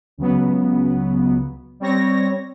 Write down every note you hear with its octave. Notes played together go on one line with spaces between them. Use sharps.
C#2 C#3 F#3 B3
G3 C4 C#5 A#6